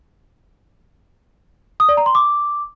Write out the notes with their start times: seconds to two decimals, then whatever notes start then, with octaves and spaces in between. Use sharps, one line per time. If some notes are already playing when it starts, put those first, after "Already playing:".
1.80 D#6
1.89 D5
1.97 A#5
2.06 C6
2.15 D6